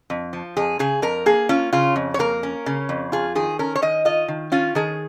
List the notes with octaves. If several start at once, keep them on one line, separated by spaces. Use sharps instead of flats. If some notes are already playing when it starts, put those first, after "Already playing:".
F2
F3
F2 G#4
C#3 G#4
F2 A#4
A#3 G#4
C#4 F4
C#3 F4
F2
C#5
A#3 A#4
C#4
C#3
F2
F4 G#4
D#3 G#4
C#4 A#4
C#5
D#3 D#5
F4 D#5
D#3
C#4 F4
D#3 G#4